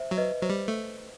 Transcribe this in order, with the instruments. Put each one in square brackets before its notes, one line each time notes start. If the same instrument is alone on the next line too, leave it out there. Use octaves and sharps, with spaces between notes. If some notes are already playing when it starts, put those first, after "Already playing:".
Already playing: [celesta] C5 E5
[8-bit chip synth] F#3
[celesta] B4 D#5
[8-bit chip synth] F#3 [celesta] C5
[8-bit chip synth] G3
A3